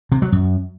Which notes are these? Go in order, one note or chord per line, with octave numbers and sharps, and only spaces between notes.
C3
F#3
F#2